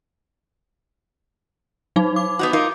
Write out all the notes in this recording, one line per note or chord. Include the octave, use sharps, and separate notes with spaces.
F#3 D#4
D6
B3 D#4 F#4
D#4 F4 A#4